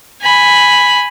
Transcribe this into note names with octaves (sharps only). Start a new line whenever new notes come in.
G#5 B5